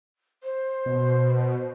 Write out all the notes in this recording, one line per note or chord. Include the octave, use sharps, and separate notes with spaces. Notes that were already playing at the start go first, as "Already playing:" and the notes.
C5
B2